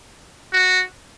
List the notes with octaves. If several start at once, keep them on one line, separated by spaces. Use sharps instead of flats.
F#4